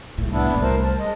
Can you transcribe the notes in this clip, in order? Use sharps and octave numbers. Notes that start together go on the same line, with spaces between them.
C2 A2
B3 D4 E4
C2 A3
A#4 C5
A5
G#3 D#5